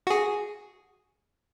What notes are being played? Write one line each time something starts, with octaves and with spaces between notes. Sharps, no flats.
F#4 G#4